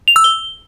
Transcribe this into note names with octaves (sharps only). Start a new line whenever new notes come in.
F7
E6
G7